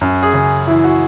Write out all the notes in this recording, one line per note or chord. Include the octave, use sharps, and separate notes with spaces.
F#2
G#4
C#3
E3 E4
F#4